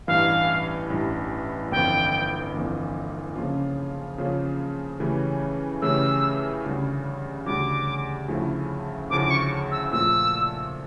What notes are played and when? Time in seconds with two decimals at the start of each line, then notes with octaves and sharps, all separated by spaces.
0.07 A1 G2 E3 G3 F5
0.90 A1 G2 E3 G3
1.71 G1 F2 E3 A#3 G5
2.53 G1 F2 E3 A#3
3.36 C#3 F3 A#3 C#4 F4
4.18 C#3 F3 A#3 C#4 F4
5.00 C#3 E3 A3 C#4 G4
5.82 C#3 E3 A3 C#4 G4 E6
6.64 D2 C#3 G3
7.46 D2 C#3 G3 D6
8.28 D2 C#3 F3 A3 E4
9.10 D2 C#3 F3 A3 E4 D6
9.24 D6
9.31 C#6
9.71 E6
9.92 A#2 F3 A3 E6